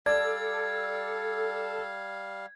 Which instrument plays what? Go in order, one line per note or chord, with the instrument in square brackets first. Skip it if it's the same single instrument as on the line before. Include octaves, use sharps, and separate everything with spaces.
[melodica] G3 F5 [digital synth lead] A4 [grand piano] D5 [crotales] G#6